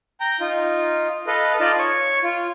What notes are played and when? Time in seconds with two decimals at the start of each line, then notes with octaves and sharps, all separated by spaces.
0.20 G5 A#5
0.40 D#4 F4
1.27 A4 B4 D#5 F5
1.60 D#4 F4 D5 D#5 F5 A5
1.79 C#5 C#6
2.24 F4